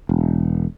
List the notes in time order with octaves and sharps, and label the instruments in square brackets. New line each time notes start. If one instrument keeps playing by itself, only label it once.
[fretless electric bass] E1